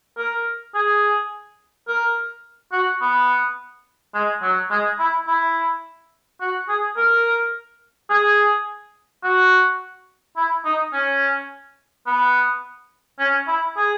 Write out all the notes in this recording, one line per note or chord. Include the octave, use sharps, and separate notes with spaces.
A#4
G#4
A#4
F#4
B3
G#3
F#3
G#3
E4
E4
F#4
G#4
A#4
G#4
F#4
E4
D#4
C#4
B3
C#4
E4
G#4